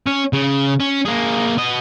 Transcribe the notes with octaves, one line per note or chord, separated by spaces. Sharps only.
C#4
C#3
C#4
A#3 G#4
B3 D#5